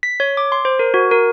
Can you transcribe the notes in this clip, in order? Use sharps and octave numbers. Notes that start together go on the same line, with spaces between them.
B6
C#5
D6
C6
C5
A#4
F#4
A#4